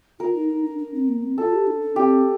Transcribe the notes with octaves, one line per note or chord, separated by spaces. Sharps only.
F4 A#4
D#4
D#4
D4
D4
C4
A#3
C4
F4 A4
G4
D4
D4
C4 G4